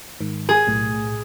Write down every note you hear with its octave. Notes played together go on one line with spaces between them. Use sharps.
G#2 D#3
G#4
B1 A2